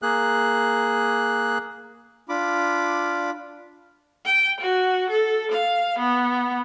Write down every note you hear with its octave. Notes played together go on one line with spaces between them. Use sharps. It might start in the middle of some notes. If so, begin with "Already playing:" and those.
A#3 G#4 F#6
D4 F4 B5 D6
G5
F#4
A4
F5
B3